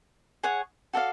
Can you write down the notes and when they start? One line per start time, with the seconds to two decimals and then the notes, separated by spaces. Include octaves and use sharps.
0.43 G#4 C#5 F#5
0.93 F#4 A4 D5 F5